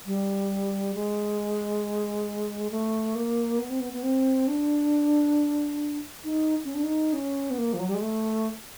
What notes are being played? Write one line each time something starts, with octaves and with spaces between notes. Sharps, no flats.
G3
G#3
A3
A#3
B3
C4
B3
B3
C4
D4
D#4
C#4
D4
D#4
C#4
B3
A#3
F3
F#3
G3
G#3
A3